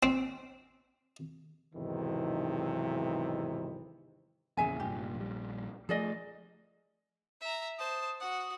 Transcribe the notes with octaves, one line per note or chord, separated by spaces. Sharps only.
C4
B1 E2 G#2 C3 D#3 E3
A#1 E2 C#3 G#4 E5 G#5
F1 G2 A#2 G4
A#1 G3
F3 A3 G#4 D5 D#5
E5 A#5
C5 A5 D#6
F#4 F#5 D#6